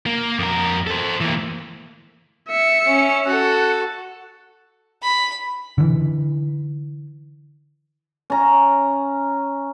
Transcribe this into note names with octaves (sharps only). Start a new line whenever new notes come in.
A#3
F2 A#4
A4 C5
E3 A#3
E5 C#7
C#4
F#4 A4 F#5
B5
D3 E3
C#4 A#5